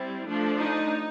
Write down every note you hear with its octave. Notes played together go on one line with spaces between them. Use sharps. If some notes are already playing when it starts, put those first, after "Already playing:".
Already playing: G3 C4 E4
F3 A3 D4
D#4